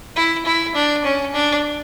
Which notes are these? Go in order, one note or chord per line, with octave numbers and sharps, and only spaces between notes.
E4
E4
D4
C#4
D4